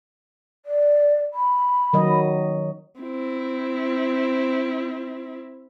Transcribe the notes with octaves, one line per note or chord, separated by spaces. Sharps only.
D5
B5
D#3 F#3 D#5
C4 E4